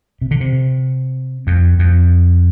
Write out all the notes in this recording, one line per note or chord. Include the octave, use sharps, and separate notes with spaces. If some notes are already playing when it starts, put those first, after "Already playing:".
C3
D3
C3
F2
F2